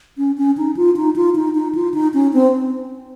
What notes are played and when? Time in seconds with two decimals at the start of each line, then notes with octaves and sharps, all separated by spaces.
0.18 C#4
0.38 C#4
0.57 D#4
0.77 F4
0.96 D#4
1.16 F4
1.36 D#4
1.55 D#4
1.75 F4
1.94 D#4
2.14 C#4
2.33 C4